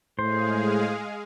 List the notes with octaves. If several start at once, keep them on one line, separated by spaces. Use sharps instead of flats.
A2 G#3 G#4 C5 F5